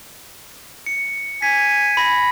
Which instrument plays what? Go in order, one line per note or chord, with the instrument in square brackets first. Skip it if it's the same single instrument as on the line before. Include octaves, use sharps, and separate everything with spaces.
[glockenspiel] C#7
[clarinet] G#5 [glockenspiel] B6
[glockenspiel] B5 A#6